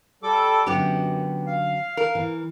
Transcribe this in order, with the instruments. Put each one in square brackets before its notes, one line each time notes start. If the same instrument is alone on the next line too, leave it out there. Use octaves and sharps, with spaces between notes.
[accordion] G3 A4 D6
[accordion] F#2 [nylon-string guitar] D3 F#3 C#4 [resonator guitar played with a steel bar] B3 G4
[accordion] F5
[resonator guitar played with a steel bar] A#4
[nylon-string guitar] E3